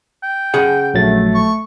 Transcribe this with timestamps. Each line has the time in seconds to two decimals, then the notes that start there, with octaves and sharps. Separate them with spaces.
0.23 G5
0.54 C#3 G#4 F#5
0.94 A#1 F#3 A3 A6
1.35 C#6